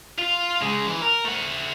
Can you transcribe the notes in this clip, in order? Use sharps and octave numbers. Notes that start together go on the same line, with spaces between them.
F4
C#3 G#3
E3
A#4
A3 F#5